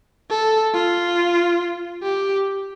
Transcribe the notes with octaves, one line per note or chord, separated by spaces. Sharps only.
A4
F4
G4